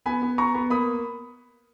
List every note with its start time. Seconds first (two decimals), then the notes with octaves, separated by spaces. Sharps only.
0.06 B3 G#5 B5
0.22 B3
0.38 B3 A#5 C#6
0.55 B3
0.70 A#3 B5 D#6